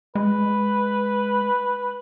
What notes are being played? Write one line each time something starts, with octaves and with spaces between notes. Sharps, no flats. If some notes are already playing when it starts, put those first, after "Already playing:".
G#3 B4